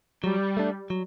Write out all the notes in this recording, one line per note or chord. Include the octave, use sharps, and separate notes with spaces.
F#3 G3
A3 D4
F#3